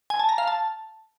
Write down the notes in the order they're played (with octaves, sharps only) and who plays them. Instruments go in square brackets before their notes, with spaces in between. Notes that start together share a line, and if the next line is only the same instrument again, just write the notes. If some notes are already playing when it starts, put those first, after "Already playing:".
[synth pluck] G#5
A5
A#5
F5
A5